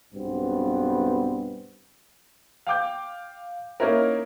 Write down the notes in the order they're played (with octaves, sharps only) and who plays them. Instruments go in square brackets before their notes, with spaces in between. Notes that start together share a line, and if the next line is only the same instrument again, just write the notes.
[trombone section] B1 G2 B3 C4
[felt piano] F5 G5 D6 G6
A#3 C#4 D#4 E4 A#4